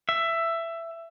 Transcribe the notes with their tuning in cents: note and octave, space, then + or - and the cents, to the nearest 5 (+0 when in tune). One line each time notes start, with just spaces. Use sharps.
E5 +15